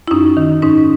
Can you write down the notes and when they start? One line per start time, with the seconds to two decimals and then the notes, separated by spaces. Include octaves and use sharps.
0.08 E4
0.11 F#2 C#4 D#4
0.37 D#3
0.62 G#2 C#4 D#4